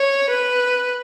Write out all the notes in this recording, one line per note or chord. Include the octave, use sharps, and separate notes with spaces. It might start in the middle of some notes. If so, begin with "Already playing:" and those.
Already playing: C#5
B4